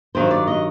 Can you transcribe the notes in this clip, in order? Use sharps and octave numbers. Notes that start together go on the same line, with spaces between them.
G2 D#3 F#3 C5
D5
D#5